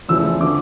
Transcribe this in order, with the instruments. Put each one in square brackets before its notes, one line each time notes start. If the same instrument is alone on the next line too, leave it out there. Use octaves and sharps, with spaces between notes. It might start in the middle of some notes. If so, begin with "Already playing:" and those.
[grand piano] E2 C#3 F3 A3 E6
D3 F3 D6